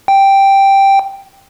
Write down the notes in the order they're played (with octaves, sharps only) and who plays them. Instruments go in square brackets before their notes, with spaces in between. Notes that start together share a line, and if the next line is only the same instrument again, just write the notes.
[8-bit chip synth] G5